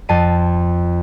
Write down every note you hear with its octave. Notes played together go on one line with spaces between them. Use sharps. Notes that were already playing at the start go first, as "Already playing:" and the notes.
F2 A5 C7 D#7